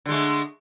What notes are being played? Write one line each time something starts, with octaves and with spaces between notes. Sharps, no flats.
D3 G#3 A3